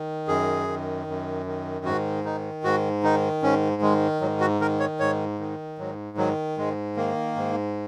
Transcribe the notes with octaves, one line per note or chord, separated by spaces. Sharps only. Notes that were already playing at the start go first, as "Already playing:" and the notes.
Already playing: D#3
F#2 G#4
D#3
F#2
D#3
G#2 F#4
D#3 D#4
G#2 F#4
D#3 D#4
G#2 C#4
D#3 G#3
G#2 F#3
F#4
D#3 A#4
C#5
G#2 C#5
D#3
G#2 F#3
D#3 F#3
G#2 G#3
D#3 A#3
G#2